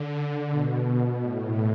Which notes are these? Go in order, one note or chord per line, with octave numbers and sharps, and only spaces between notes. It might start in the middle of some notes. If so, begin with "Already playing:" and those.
Already playing: D3
B2
A2